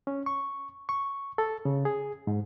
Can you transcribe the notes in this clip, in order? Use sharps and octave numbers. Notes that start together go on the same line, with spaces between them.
C#4
C#6
C#6
A4
C#3
G#4
G#2